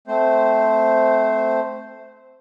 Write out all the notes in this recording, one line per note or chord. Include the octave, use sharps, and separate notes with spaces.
A3 C4 C5